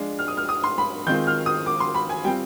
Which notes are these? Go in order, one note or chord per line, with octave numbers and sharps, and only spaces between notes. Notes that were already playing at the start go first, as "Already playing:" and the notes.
Already playing: F3 G#3 D4 F4
F6
D#6
F6
D#6
C6
B5
D#3 G#3 C4 F4 G6
F6
D#6
D6
C6
B5
G#5
G3 C4 F4 G5